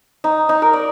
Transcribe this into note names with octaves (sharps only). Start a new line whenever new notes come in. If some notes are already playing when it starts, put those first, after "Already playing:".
D#4
D#4
A#4
D5